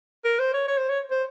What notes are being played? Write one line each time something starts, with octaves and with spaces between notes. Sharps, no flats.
A#4
C5
C#5
C#5
C5
C#5
C5